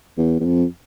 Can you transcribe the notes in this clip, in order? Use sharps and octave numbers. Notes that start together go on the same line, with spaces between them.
E2
E2
F2